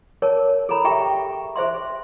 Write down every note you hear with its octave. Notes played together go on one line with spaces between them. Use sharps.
G#4 A#4 C#5 A5
G#4 A4 C#5 A#5 B5
G4 G#4 E5 G5 A#5 C#6
G#4 C5 E5 C6